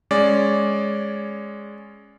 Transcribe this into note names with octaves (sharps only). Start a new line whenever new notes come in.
G#3 C#4 D5